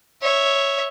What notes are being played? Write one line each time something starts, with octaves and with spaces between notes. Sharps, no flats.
C#5 E5